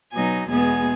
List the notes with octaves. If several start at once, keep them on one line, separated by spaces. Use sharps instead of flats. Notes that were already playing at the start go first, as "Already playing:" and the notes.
B2 F#3 B3 D#4 G#5
E2 B2 G#3 B3 G#5